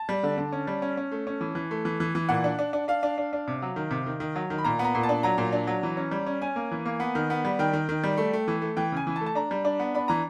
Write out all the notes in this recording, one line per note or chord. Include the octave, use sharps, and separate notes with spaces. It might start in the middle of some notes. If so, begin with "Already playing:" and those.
Already playing: A5
G3
D3
D3
C#4
G3
C#4
C#4
A3
C#4
E3
E3
A3
E3
E3
E3
A#2 F#5
D4
D4
D4
D4 F5
D4
D4
D4
C3
F#3
D#3
C3
D#3
D#3
F#3
D#3
B5
A#2 A#5
B3
A#5
A#2
A5
D4
F#3 A#5
A#2
D4
F#3
E3
C#4
G3
C#4
C#4 G#5
A#3
E3
A#3
B3
D#3
B3
G3
D#3 G5
D#3
D#3
G3
A3
A3
E3
A3
E3 G5
C#3 G#5
E3
A5
A3
A5
D4 A#5
G3
D4
B3
D4 B5
E3 A#5